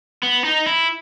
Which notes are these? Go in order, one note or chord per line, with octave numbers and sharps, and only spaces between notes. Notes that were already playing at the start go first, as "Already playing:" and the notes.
B3
D#4
E4